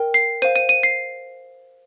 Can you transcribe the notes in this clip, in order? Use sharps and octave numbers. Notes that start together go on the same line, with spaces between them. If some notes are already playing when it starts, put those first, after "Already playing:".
Already playing: A#4 G5
C7
C5 F5 D#7
D#7
D#7
C7